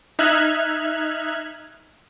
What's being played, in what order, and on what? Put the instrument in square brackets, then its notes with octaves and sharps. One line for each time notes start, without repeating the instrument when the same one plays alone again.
[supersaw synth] D#4 E5 F6 F#6 G#6